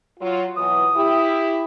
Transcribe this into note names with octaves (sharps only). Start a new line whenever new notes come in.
F#3 F4
B2 E3 F#3 D#6
E4 G4